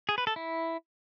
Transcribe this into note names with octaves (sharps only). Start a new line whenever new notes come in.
G#4
B4
A4
E4